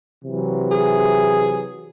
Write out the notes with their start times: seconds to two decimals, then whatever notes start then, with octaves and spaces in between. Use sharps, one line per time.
0.24 C3 E3 F#3
0.71 G#4